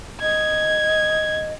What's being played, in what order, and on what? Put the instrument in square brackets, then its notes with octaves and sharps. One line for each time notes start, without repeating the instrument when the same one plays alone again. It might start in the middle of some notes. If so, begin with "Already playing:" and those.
[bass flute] D#5 [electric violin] G#6